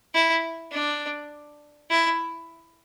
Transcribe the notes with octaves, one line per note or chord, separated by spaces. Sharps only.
E4
D4
E4